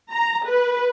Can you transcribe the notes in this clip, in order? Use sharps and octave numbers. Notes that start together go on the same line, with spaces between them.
A#5
B4